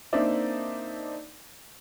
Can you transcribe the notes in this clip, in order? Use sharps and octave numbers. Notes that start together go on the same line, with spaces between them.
A#3 C4 D4 D#4 D5 E5